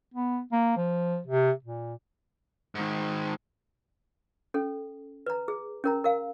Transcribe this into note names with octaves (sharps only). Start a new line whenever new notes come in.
B3
A#3
F3
C3
A#2
G#2 D#3
C#4 A4
B4 A#5
G#4
C#4 A#4 A#5
A#4 F5